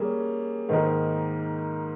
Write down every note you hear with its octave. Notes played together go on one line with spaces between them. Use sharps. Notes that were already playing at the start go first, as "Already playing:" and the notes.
Already playing: G3 A#3 C#4 G#4
G#2 D#3 A#3 D#4 A#4